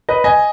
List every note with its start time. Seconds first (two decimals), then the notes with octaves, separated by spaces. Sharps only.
0.09 B4 D#5
0.24 D#5 G#5